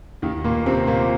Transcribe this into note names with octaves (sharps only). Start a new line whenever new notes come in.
D#2 D#3
A#2 A#3
C3 C4
A#2 A#3